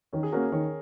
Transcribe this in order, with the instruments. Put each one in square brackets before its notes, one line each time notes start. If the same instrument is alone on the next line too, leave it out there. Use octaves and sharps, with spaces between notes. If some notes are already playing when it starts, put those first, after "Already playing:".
[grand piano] D#3 [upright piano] C#4
[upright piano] G#4
[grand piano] A#3 C#4 F#4 [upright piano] A#4
[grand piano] D#3 [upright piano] C#5